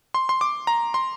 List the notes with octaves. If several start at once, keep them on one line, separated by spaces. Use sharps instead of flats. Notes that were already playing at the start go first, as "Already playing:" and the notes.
C6
C6
D6
A#5
C6